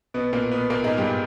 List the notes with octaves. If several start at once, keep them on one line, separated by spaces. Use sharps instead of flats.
B2 B3
A#2 A#3
B2 B3
A#2 A#3
G#2 G#3
G2 G3